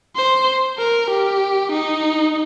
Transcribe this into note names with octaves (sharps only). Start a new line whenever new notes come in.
C5
A#4
G4
D#4